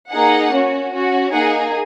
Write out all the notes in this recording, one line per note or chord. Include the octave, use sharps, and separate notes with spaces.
A#3 D#4 G#4 F#5
C#4 F#4
C#4 F#4
A#3 D#4 G#4 F#5